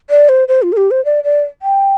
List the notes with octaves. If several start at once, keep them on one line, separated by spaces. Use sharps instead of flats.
D5
C5
C5
F4
A#4
G4
C5
D5
D5
G5